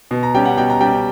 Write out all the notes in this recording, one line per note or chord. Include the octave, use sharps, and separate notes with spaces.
B2
A#5
G3 C#4 G5
F#5
B2 G5
A#5
G3 C#4 G5